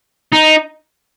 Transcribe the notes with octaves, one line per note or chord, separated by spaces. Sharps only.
D#4